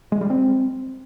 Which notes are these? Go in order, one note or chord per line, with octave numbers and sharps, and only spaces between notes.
G#3
G3
C4